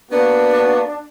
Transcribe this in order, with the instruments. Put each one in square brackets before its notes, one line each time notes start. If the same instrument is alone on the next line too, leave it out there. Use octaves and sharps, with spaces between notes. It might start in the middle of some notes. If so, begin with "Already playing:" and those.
[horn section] A#3 B3 F#4 [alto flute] D4